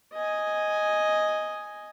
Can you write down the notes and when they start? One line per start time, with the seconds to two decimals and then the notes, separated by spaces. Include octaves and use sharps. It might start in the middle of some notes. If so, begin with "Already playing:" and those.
0.13 D#5 G#5